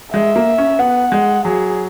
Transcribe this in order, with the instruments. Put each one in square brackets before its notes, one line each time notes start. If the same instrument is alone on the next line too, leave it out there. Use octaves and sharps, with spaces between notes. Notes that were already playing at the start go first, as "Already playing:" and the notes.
[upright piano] G#3 [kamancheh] E5
[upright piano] A#3
C#4
[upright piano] B3 [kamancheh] F#5
[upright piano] G#3
[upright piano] F#3 [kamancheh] G#4